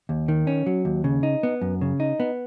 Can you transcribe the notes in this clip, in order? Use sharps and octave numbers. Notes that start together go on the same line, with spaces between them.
D#2
D#3
C#4
F#3
D#2
C#3
D#4
B3
F#2
C#3
D#4
B3